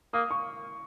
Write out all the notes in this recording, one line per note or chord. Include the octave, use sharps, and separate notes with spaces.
A#3 D#6
C#6